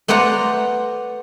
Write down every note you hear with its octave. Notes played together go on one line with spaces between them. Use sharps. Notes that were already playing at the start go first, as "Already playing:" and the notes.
A3 B3 C5 D5 F#5 A#5